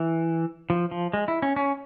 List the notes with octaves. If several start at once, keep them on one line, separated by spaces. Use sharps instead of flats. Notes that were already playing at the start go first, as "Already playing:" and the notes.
Already playing: E3
F3
F3
G#3
E4
C#4
C#4